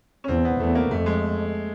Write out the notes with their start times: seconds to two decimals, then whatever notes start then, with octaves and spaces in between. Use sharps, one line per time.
0.24 C#4
0.28 E2 C4
0.45 B3
0.59 E2 A3
0.75 A#3
0.90 F2 A3
1.06 G#3